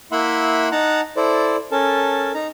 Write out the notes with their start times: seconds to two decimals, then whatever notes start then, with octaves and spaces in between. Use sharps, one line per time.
0.12 A#3 E4 E5 F#5 B5 C6
0.72 D#4 F#5 A5 A#5 F#6
1.17 E4 A4 C5 D5
1.72 C#4 A4 A#4 A5
2.34 D#4 A#5